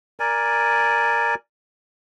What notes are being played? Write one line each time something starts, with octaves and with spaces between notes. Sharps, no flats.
A#4 D5 G#5